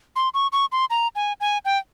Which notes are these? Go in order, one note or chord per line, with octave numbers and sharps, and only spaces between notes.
C6
C#6
C#6
C6
A#5
G#5
G#5
G5